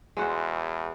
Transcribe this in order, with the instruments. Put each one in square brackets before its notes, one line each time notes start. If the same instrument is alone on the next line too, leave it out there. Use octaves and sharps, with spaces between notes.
[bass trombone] E2 [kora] G#3 F#4 C5